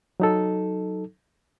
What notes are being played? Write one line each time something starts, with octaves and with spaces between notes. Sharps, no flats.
F#3 D#4 A4